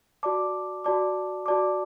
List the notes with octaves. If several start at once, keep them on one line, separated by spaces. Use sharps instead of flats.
F#4 D5 A5 D6
F#4 D5 A5 D6
F#4 D5 A5 D6